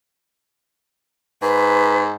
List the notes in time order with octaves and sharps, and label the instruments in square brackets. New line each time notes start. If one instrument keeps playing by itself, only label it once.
[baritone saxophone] G#2 [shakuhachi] B4